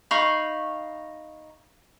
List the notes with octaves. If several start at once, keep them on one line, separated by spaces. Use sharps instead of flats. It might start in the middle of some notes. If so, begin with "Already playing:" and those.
D#4 F5 B5 C#6